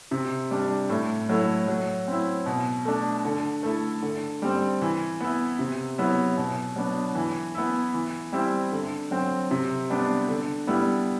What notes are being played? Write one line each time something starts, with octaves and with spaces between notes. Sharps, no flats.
C3
G3 D4
A2
F#3 A3 E4
F#3
C4 E4
B2
A3 D4
D3
A3 E4
D3
G3 C4
E3
B3 E4
C3
F#3 B3 E4
B2
F#3 B3 D4
E3
B3 E4
E3
G3 C4 E4
D3
F#3 C4
C3
G3 B3 D4
D3
G3 B3 E4